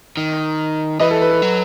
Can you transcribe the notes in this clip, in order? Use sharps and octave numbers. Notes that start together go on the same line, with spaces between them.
D#3
E3 B4 D#5
A4
B4
A4
F#3